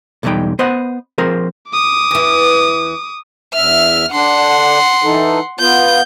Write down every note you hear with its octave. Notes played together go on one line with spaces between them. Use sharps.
B1 E2 E3 G3 D#4 G5
B3 C5 D#5 F#5
F3 C4 G#4 A#4 C5
D6 D#6
E2 E3
E2 E5 F6
D3 D4 F#5 C6
E3 D#4 A4
B3 F4 G6